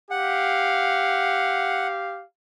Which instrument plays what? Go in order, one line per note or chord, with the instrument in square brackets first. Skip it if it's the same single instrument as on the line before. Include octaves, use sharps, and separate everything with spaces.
[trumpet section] G4 F5 [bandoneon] F#5